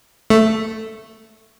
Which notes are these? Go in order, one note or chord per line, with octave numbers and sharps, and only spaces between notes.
A3